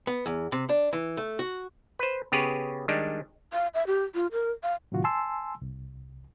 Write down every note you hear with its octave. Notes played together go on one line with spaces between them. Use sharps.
B3
E2
C3
D4
E3
A3
F#4
B4 C5
C#3 B3 G4 G#4 B4 C#5
D#3 G3 G#3 D4
F5
E5
G4
F4
A#4
F5
A2 C3 D#3 F#3 F4 F#4
G#5 A5 C6 E6
C2